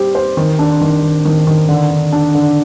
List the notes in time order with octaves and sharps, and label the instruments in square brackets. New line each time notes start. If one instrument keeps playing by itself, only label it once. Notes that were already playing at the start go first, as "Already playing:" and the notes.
Already playing: [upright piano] G3 G4 C5
C5
D#3
D4
D#3
D#3
D#3
D#3
D3
D3
D4
D3